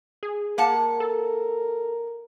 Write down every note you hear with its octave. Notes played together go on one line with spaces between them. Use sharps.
G#4
A#3 A#4 F#5 A5
A4